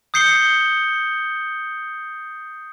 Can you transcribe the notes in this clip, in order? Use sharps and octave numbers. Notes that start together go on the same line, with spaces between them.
D#6 G6 C7 C#7 G7